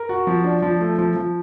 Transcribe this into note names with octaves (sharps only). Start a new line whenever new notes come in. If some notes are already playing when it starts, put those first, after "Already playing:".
Already playing: A#4
F#4
F3
D4
F3
A3
F3
F3